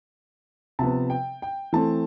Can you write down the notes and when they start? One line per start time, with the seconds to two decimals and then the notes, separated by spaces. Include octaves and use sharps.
0.79 C3 F3 B3 A5
1.10 G5
1.42 G5
1.73 E3 A3 C4 A5